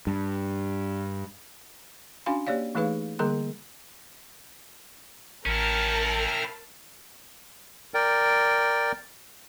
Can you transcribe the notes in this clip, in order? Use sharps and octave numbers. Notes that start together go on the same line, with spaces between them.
G2
C#4 D4 F#4 F5 G#5 C6
A#3 G4 C#5 D5 F5
E3 A3 D#4 G#4 B4 F5
D3 G3 A#3 G#4 A#4 C6
A1 C#4 E4 A#4 G5 A5 A#5 F6
A#4 D5 G5